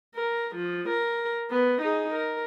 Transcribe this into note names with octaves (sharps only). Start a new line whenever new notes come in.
A#4
F3
A#4
B3
D#4 G#4
A#4